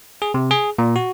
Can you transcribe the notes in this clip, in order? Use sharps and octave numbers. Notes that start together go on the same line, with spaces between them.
G#4
C3
G#4
A#2
F#4